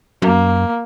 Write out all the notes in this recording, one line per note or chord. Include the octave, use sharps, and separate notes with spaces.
F#2 A#3